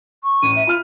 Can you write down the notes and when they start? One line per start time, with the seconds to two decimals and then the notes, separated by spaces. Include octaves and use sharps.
0.24 C#6
0.43 A1 D#7
0.56 E5
0.67 F4 B5 F6